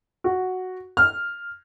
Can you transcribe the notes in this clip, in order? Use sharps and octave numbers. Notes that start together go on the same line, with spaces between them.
F#4
F6